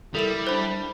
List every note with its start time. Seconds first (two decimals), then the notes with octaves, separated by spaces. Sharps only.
0.15 G3 E4 A4 A#4 E7
0.47 D4 C5 B5